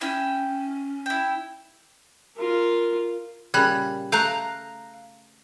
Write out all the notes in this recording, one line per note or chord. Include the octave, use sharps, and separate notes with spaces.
C#4 E4 G5
E4 G5
F4 A#4
A#2 C#3 G3 B5 F#6 G#6
A3 F5 A#5 F#6 G6